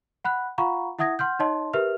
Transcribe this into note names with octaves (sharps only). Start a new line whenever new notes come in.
F#5 B5 F#6
F4 F5 F#5 A#5 B5 C#6
E4 E5 F#5 D#6 G#6 A#6
F#5 C6 F6 G6
D#4 C#5 D#5 A5 C6
G4 A#4 B4 E5 F6 F7